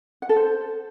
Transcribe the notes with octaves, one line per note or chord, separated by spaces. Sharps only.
F#5
A4
C5